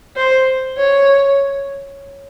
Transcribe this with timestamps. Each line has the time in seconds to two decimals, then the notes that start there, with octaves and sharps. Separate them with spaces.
0.17 C5
0.78 C#5